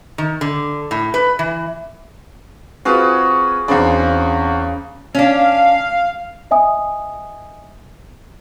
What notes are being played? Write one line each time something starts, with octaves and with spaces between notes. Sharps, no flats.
D#3
D3
A2
B4
E3
C4 F4 F#4 G#4 B4
E2 C#3 C4 D4 C5
C#4 D4 F5
D#5 E5 G#5 D#6